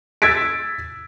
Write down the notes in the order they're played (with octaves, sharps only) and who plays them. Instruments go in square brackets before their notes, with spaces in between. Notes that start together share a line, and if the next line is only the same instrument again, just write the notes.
[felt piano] E6 G#6 A6 B6 D7